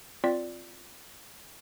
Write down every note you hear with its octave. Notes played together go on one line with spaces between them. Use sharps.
C4 F4 D5 B6